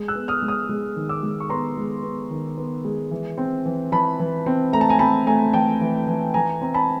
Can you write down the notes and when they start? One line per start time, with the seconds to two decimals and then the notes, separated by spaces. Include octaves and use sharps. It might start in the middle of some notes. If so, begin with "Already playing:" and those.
Already playing: G#3
0.08 E6 F#6
0.15 B3
0.28 D#6 F6
0.42 G#3
0.48 D#6 F6
0.69 G#3
0.96 D#3
1.09 D6 E6
1.23 G#3
1.40 C#6
1.49 B3 A#5 C6
1.77 G#3
2.03 B3
2.30 D#3
2.58 B3
2.85 G#3
3.11 E3
3.38 C4
3.65 E3
3.92 E3 A5 B5
4.20 E3
4.46 C4
4.73 A3 A#5
4.81 A5
4.89 G#5 A#5
4.99 C4 A5 B5
5.27 A3 G#5 A#5
5.53 E3 G5 A5
5.81 E3
6.07 E3
6.34 E3 G#5 A#5
6.61 C4 A#5
6.74 A5 B5